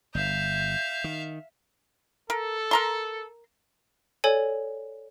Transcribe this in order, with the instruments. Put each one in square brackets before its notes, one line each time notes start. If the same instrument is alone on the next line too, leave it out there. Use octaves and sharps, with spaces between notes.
[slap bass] G1 [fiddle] E5 F5 [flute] G6
[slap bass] D#3
[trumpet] A4 [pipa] A#4
[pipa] A#4 A#5 C6
[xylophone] A4 C#5 D5 G#5